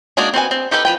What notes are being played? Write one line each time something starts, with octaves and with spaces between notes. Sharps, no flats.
G#3 A#3 D4 D#4 F#4
C4 F#4 B4 G#5
C4
D#4 G4 A4 B4 G5
F3 B4 G5